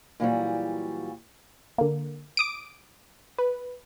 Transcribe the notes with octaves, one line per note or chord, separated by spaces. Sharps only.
A#2 E3 F#3 G3
D3 A#3
D6 D#6 D7
B4